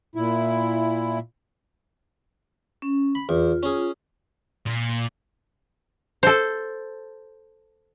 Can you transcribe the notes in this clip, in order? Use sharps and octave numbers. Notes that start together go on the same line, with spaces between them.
A#2 E4
C#4
B5
E2 F4
C#4 G#4
A#2
A4 C5